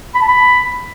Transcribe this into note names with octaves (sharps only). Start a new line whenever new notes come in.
B5
A5
B5